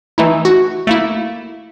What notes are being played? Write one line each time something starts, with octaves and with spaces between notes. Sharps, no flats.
E3 A3 D#4 E4
F#4
A3 A#3 E4